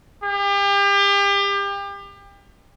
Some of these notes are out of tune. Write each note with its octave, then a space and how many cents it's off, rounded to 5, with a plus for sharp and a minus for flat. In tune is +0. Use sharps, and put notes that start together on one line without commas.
G4 +35